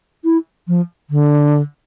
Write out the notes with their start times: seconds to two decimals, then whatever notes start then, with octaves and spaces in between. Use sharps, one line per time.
0.24 E4
0.68 F3
1.10 D3